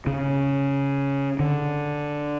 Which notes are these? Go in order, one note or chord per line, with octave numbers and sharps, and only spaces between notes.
C#3
D3